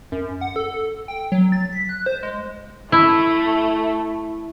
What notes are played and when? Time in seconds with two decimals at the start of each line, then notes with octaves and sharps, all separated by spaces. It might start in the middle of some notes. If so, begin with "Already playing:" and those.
0.12 F#2
0.41 F#5
0.56 A4
1.08 G5
1.32 F#3
1.52 A6
1.72 B6
1.89 F#6
2.06 C5
2.23 G#3
2.92 A3 E4